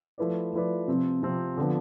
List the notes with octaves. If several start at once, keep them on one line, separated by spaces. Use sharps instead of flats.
F3 A3 E4 B4 D5
F3 A3 E4 B4 D5
C3 F3 C4
C3 F3 C4
D3 F3 B3